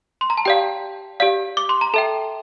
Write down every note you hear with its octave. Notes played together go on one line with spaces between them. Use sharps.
C6
A#5
A5
G4 D5 F5 G5
G4 D5 F5
D6
C6
A#5
A4 E5 G5 A5